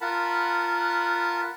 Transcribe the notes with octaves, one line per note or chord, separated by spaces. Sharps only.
F4 A#4 F#5 A5 B5